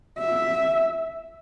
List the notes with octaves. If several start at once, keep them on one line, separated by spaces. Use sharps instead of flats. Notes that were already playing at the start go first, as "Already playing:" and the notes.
E5